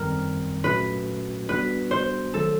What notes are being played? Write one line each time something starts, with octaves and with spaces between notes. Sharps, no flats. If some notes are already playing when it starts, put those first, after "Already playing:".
Already playing: F#2 D#3 G3 C4 A#4
A#2 F#3 A3 C#4 F#4 B4
G3 B3 D4 F#4 B4
C5
D#3 F#3 A3 A4